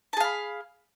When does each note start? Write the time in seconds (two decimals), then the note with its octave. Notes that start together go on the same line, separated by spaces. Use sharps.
0.13 A5
0.17 G#4
0.20 F5
0.24 B5